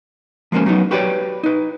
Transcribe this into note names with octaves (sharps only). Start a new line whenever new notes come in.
F3 G#3 A#3 C#4 C5
F#3 A3 B3 D#4
F#4 G4 B4 C#5 D5
D#4 B4